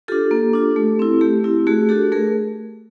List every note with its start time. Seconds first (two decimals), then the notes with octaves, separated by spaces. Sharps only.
0.08 D4 F4 G4 A4
0.31 A#3
0.53 D4 F4
0.76 A3
0.99 C4 E4
1.21 A3 G4
1.44 C4 E4
1.67 A3 F#4 G#4
1.89 D4 F#4 G4 A4
2.12 A3 G#4 A#4